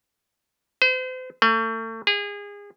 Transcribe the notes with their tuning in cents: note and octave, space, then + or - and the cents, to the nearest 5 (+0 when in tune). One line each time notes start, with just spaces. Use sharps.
C5 -40
A3 +35
G#4 -30